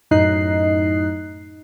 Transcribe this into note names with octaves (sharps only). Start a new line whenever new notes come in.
F#2 A2 D#4 D#5 F#6 C7